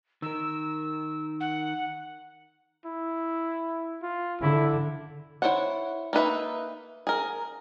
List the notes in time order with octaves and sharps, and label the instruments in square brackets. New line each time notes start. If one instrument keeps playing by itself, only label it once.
[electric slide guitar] D#3 A#4 [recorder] E6
[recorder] F#5
[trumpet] E4
F4
[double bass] D3 [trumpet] E4
[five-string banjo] E4 G#4 C5 C#5 F#5
A#3 D#4 B4 E5
G#4 A#4